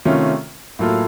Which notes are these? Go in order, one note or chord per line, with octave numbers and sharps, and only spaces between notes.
C3 D#3 A3 C#4 F4
A2 F#3 A#3 F4 A4